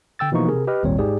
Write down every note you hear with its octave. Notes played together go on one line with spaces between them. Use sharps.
D3 G5 E6 A6
B2 E3 F3 A#3 D#4 C#6
C3 G#4 A#4
G4 B4 D#5 F6
G#1 D#2 A#2 G3 C4 C#5
G#2 G4 G#4 D5